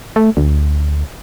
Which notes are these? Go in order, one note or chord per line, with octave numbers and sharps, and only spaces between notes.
A3
D2